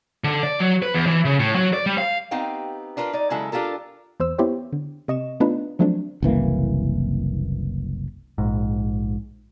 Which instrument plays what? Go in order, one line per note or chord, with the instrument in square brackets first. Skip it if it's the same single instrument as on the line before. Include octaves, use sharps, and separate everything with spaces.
[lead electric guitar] D3
D5
F#3
B4
E2
E3
C#3
A2
F#3
D5
G3
F5
[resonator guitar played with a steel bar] B3 C4 D#4 G4 F5 G5
D4 F4 A#4 B4
D#4 D5
C#3 F#3 G#3 E4 A4
D4 F4 G4 A4 A#4
[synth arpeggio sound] E2 C5 E6
B3 E4 G4 C5 C#5
D3
C3 D#5 C#6 E7
A3 B3 D4 D#4 F4 B4
F3 F#3 A3 C4 D4
[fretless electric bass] F#1 C2 E3 A#3
[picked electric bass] A#1 G#2